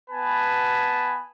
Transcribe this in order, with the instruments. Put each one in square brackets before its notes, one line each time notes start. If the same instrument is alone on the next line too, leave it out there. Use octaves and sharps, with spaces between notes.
[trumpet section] B3 B4 G#5 A5